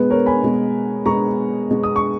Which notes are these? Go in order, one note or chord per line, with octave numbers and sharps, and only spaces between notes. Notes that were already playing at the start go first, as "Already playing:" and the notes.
Already playing: B2 G#3 B3 B4
A#4 C#5
G#5 B5
B2 G#3 B3
B2 G#3 B3 A#5 C#6
B2 G#3 B3
D#6
C#6